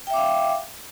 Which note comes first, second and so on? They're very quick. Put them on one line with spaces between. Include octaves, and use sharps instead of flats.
G5 E5 D6 F5